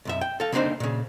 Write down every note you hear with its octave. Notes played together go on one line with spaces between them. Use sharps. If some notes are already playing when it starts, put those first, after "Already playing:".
B1 F#2 E5
G5
A4 F5
C#3 A#3 C4 D4 D#4 C5
A#2 C#3